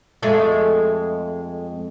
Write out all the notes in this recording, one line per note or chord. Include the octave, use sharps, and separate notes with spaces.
F2 G#3 A3